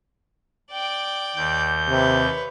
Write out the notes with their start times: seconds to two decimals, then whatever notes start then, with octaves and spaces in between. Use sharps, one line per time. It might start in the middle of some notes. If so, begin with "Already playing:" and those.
0.72 D5 G5
1.36 D#2 G6
1.89 C3 B4 C#5